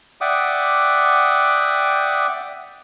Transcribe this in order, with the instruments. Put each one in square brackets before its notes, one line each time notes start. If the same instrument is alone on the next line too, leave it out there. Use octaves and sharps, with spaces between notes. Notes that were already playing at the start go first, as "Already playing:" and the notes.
[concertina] D5 E5 F#5 G5 D6 D#6